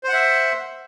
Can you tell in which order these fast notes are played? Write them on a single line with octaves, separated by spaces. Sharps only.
C5 F#5 E5